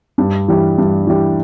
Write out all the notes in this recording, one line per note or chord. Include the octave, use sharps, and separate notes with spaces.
G2
E3 G3
G2
E3 G3